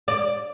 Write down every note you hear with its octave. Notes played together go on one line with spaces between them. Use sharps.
D5